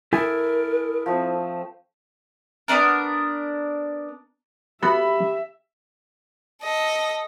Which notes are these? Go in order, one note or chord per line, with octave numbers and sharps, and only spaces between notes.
E4 A4 A#4 G#5 D#6
F3 A3 C4
B3 C#4 D4 A#4
B3 F#4 G4 A4 E5 B5
A4 D#5